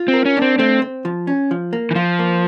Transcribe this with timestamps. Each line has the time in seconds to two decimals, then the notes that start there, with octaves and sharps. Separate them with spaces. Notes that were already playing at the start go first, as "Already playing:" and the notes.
Already playing: F4
0.08 C4
0.14 A#4
0.25 C#4
0.37 C4 D4
0.59 A3 C4
0.82 C4
1.05 F3
1.27 C#4
1.51 F3
1.73 A#3
1.91 E3
1.95 F3 F4
2.19 A#3